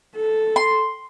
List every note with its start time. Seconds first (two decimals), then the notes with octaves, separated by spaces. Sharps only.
0.16 A4
0.56 C6